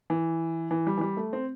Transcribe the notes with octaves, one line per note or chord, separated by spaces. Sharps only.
E3
E3
G3
E3
G3
A3
C4